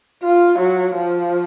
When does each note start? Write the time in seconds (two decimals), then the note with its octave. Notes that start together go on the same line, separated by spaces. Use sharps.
0.23 F4
0.59 F#3
0.95 F3